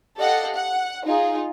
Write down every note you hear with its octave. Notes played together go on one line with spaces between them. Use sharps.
G4 A4 D#5 F5 F#5
F#5
D#4 F4 G#4